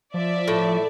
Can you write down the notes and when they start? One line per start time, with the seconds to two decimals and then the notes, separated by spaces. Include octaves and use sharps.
0.14 F3 D5 E5
0.48 A2